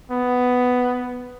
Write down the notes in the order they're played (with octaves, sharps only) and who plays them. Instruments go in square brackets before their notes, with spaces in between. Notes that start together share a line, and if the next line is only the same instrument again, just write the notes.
[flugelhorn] B3